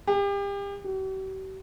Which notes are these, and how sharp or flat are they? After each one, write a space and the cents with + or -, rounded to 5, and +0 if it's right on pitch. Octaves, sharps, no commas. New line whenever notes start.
G4 +35
G4 -45